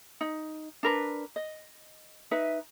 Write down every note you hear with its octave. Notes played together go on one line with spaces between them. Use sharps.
D#4
D4 A#4 B4
D#5
D#4 B4 E5